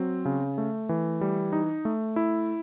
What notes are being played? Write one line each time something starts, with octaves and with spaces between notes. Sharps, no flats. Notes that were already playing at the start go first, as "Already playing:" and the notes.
Already playing: F#3 C4
C#3
A3
E3
G3
D#4
A3
E4